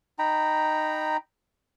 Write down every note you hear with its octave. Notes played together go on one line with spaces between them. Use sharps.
D#4 G5 A#5 B5